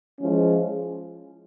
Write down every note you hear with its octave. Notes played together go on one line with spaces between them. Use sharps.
F3 G#3 C#4 E4 G#4